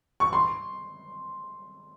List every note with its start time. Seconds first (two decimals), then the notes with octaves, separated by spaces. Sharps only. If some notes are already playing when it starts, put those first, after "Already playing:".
0.20 C#6
0.33 C6